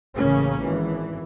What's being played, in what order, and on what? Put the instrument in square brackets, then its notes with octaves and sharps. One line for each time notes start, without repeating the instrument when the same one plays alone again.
[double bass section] A1 C#3 A#3 C#4
G#1 E3